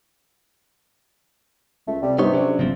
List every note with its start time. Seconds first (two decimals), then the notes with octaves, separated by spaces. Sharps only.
1.87 C#2 A3
2.02 C3 G3
2.19 G2 C3 B3 D#4 C#5
2.33 C#3 F#3 D4
2.59 G1 C#3 F3 C4